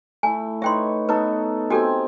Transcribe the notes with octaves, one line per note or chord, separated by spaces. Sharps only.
A3 E4 G#5
D#4 B4 C#5 E5 G5 C6
B3 D#4 A4 B4
C4 F#4 G4 A4 G5 G#5